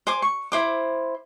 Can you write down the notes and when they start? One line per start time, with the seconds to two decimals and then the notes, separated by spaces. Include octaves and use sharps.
0.07 C5 G#5 D6
0.22 C#6
0.52 E4 C5 D6